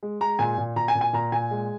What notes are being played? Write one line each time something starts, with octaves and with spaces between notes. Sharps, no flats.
G#3
G#3 A#5
A#2 G#5
A#2
A#2 A#5
G#5
A#2
G#5
A#2 A#5
A#2 G#5
G#3